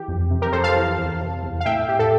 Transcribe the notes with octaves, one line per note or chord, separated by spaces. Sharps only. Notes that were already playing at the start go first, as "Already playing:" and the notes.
Already playing: E3 G4
F2
C3
G4 A#4
F2 A4 C5
F5 A5
E3
E2
C3
E2
F5
A2 E5 G5
A2 G4
A4